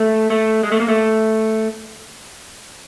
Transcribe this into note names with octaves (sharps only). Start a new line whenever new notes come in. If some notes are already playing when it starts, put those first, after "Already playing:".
Already playing: A3
A3
G#3
A3
A#3
A3